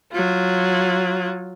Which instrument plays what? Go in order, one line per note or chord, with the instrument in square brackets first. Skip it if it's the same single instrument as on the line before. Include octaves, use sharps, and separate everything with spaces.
[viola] F#3 F4